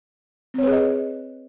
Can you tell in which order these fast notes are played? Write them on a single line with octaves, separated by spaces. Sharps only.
C4 C#5 B4 G#4 D#5